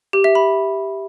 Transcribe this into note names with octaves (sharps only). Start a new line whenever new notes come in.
G4
E5
B5